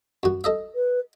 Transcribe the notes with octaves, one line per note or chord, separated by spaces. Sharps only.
F#2 F#4
A4 D#5 E5
B4